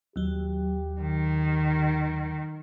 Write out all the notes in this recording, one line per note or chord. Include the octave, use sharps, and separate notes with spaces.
D#2 F#3 G4
D#3